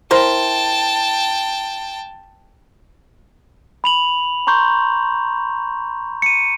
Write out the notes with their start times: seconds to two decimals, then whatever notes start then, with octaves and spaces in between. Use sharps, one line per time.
0.11 E4 A#4 C5 G5 A5
3.84 B5 F7 F#7
4.47 A#5 C6 C#6 G6
6.22 C#7 D#7